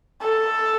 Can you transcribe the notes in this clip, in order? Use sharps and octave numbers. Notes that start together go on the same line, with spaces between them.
A4